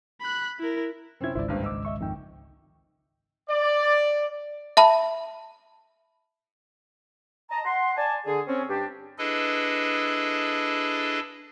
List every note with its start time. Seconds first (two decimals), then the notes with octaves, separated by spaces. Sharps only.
0.21 B5 F#6
0.59 E4 A#4
1.21 F#2 C3 C4 C#4 E4 G#6
1.35 G#1 C#2 E4 C5 D5
1.48 F#1 G2
1.64 D#5 D6 E6
1.85 D#5 E5 C#6
2.00 F2 D#3 G5
3.49 D5
4.77 E5 A5 B5
7.51 D#5 A5 A#5
7.65 F#5 C6
7.97 D5 G#5 A5
8.26 D3 G#4
8.47 C4 C#4
8.69 G2 D4 G4
9.18 D4 E4 G#4 A4 B4 D#5